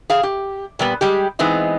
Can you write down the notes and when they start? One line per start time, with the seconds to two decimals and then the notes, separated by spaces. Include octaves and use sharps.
0.10 G#4 F5
0.23 G4
0.79 A#2 G3 B3
1.01 G3 G#3 G4
1.39 E3 G#3 B3 C4 D#4